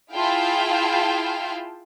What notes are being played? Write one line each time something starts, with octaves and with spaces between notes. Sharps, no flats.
E4 F4 G#4 F5 G5 A5